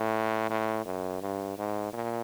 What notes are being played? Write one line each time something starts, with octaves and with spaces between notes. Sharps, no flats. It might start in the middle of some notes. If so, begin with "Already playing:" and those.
Already playing: A2
A2
F#2
G2
G#2
A#2